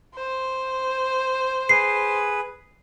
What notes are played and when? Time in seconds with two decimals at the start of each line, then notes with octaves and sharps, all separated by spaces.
0.15 C5
1.69 G#4 B4 C7